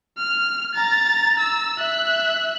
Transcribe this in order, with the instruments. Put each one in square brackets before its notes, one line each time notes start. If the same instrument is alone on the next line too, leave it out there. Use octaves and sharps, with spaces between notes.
[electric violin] F6
A#5 A6
E6
E5 F#6